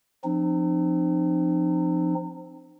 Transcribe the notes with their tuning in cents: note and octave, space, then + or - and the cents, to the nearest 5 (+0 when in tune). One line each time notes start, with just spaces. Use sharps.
F3 +0 C4 +0 D#4 -40